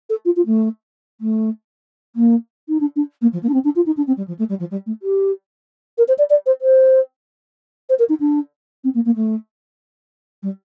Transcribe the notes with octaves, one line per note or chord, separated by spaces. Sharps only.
A4
F4
F4
A3
A3
A#3
D#4
D4
D4
A#3
F3
A#3
D4
C4
D4
F4
D#4
D4
C4
G3
F3
A3
G3
F3
G3
A3
G4
A#4
C5
D5
D5
C5
C5
C5
A#4
D#4
D4
C4
A#3
A#3
A3
G3